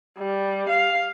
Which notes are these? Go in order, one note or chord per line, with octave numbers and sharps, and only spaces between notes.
G3
F5